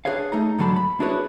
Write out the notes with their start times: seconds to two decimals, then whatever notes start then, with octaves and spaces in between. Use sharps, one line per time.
0.05 D4 G#4 B4 C#5 F5
0.32 A3 D#4 A#5
0.59 G#2 D3 F#3 A5 B5
0.76 B5
1.00 D4 E4 F#4 G#4 B4 C#5